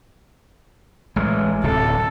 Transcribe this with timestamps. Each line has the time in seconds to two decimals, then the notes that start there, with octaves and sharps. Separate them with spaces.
1.16 A1 G#3
1.64 D1 C3 A4